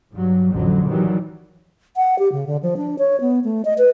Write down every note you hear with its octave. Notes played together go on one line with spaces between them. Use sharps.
G2 F#3
A1 F2 D3 F#3
D#3 E3 F#3 G3
F#5
G4
C#3
D3
F3
D4
C#5
B3
A3
D#5
B4